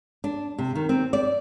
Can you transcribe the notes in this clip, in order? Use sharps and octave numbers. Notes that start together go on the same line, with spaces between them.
D4
C3
D#3
C4
D5